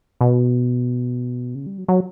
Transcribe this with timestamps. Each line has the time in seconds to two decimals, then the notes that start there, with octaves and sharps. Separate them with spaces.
0.21 B2
1.55 C#3
1.66 G3
1.78 F#3
1.88 F#3